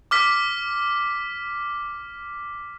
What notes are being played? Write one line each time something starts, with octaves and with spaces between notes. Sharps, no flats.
D6 F6 B6